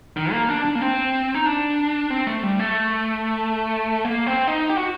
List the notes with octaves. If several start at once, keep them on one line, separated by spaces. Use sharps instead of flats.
D#3
A#3
D4
D4
A#3
C4
D#4
D4
C4
A3
G3
A3
A#3
C4
D#4
G4
F#4